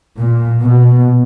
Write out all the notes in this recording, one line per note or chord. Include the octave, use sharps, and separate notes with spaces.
A#2
B2